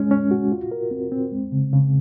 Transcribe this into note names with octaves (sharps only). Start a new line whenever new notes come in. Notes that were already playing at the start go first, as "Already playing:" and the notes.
Already playing: G#3 C#4
C#4
F#4
F4
A#4
C4
C4
G#3
C#3
C#3